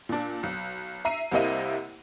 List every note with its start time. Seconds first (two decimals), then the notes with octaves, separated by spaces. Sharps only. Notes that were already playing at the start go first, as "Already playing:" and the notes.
0.09 A#2 D4
0.43 B1
1.05 E5 A#5 C7 D#7
1.31 C2 C3 A#3 E4 D#5 D#7